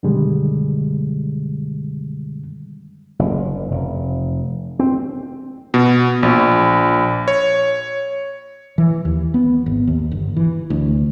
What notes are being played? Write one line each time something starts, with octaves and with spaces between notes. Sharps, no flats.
F#2 B2 D3 D#3 G3 G#3
F#1
F1
C4
B2
A#1
C#5
E3
D#2
B3
G#1
D#2
G1
E3
D2